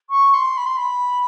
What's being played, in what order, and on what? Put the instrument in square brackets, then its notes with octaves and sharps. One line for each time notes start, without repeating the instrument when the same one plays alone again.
[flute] C#6
C6
B5
C6
B5